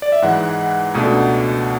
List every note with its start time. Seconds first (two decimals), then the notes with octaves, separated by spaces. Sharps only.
0.02 D5
0.12 E5
0.22 G#2 E3 G#3 F#5
0.94 C#2 B2 A3 D4